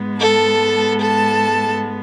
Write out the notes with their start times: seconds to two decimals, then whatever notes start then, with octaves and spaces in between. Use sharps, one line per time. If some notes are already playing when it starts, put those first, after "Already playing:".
Already playing: G#2 G#3 B3
0.19 A4 A5
1.00 A4 A5